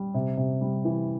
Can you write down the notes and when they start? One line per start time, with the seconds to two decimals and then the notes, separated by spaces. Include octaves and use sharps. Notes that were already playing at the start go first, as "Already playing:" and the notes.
Already playing: G3
0.14 C3
0.37 C3
0.61 G3
0.85 E3